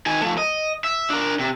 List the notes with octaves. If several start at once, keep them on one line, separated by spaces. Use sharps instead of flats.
D#3 G#5
F3 A3
D#5
E5
D4 A#4
C3